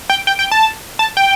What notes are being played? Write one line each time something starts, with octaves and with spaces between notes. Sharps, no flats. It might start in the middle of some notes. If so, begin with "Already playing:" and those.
G5
G5
G5
A5
A5
G5